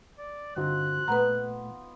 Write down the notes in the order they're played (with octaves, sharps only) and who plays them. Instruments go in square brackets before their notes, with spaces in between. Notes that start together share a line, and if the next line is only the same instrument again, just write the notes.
[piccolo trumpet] D5
[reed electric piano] G2 D3 F#4 [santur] C4 D#4 F4 [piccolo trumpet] F#6
[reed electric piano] A#2 A3 [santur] B3 [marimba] B4 A#5